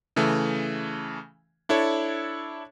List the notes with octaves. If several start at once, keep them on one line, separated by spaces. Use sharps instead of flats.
C#3 E3 A3
D4 E4 A4 C#5